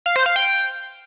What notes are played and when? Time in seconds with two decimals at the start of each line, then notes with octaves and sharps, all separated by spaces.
0.06 F5
0.16 C5
0.26 F5
0.36 G5